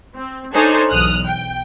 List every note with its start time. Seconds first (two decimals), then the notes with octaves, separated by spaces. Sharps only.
0.15 C4
0.54 D4 D#4 G#4 A4 C5 C#5
0.90 B1 E2 D#6 F6 F#6
1.27 G5